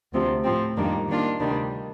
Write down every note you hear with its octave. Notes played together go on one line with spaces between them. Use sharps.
D2 C3 F3
A2 F3 C4
F2 D#3 G3 A#3 D4
D#3 A#3 D4 F4
D2 C3 D#3 G3 D4